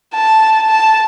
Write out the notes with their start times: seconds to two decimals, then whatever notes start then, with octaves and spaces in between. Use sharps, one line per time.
0.15 A5
0.70 A5